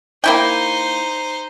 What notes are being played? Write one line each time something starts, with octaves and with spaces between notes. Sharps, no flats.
A#3 D#4 E4 C5 G5